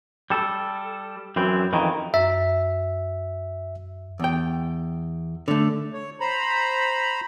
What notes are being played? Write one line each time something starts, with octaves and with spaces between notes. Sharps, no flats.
G3 A4
F#2 E3 C4
F2 D#3 E3
F#2 E5
E2 G5
D3 A3
C#5
C5 A#5 B5